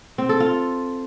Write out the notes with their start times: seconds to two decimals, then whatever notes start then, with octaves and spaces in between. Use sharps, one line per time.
0.18 C4
0.29 A4
0.40 F4